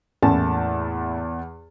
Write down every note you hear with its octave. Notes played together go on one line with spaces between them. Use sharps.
E2 A2 A#3 C#4 A5